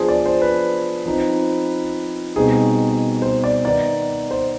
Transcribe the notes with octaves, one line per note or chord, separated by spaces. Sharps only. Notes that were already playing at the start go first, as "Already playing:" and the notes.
Already playing: F3 B3 D4 G#4 C5
D5
C5
B4
F3 C4 D#4
B2 G3 C4 D#4 G#4
C5
D5
D#3 B3 D#4 D5
C5